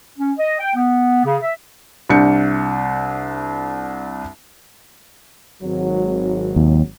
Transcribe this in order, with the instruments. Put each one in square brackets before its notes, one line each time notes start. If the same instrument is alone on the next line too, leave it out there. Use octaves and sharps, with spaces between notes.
[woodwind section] C#4
D#5
G5
B3
C#3
E5
[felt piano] C2 D4 G6 C#7
[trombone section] G#1 F#3
[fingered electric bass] D#2